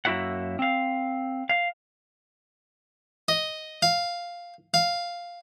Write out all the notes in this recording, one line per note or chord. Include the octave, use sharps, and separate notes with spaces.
F#2 A#3 E4 F#4 E5 F#5
C4 F5
F5
D#5
F5
F5